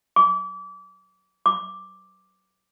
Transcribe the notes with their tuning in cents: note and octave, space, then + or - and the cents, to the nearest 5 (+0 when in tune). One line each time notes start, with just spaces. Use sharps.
D6 -30
D6 +0